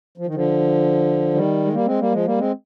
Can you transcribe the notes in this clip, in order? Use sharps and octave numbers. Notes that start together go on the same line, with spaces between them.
F3
D#3
D3 F3
D#3 G3
G#3
G3 A#3
G#3 C4
G3 A#3
F3 G#3
G3 A#3
G#3 C4